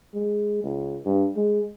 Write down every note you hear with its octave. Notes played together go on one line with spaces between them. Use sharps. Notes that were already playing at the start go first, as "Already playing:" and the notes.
G#3
C#2
G2
G#3